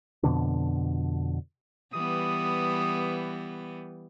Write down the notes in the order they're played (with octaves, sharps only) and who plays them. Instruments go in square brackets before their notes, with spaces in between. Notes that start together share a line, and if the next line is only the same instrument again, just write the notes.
[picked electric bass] F2 B2 D3 D4
[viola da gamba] E3 G3 B3 [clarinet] D#6